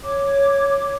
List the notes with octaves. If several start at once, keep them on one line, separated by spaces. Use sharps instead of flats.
C#5 D6